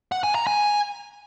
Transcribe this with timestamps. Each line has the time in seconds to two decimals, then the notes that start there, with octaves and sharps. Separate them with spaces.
0.12 F#5
0.23 G#5
0.35 A#5
0.47 G#5